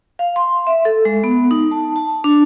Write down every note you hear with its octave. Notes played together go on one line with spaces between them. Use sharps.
F5
C6
E5
A4
G#3
B3
D#4
A5
A5
D4